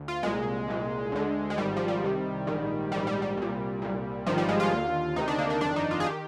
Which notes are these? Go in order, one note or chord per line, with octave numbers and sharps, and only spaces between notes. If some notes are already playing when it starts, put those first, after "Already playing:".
Already playing: D2
F4
C2 A#2 G#3
C2 A#2
D2 D3
G#3
G#1 G#2 D#3 G3
F3
G3
C2 C3 D#3
A#1 G#2 D#3
A#1 G#2 D#3 G3
G3
G3
C2 A#2
C2 A#2
G#1 G2 D#3 F3
G3
G#3
F4
D#2 D3
D2 C3 D#3 D#4
D4
A#3
D4
G1 F2 D#3 D4
D#4
F4
G#4
D#3 G4